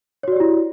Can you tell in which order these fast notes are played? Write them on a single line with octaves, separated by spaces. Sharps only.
C#5 F#4 D5 G4 E4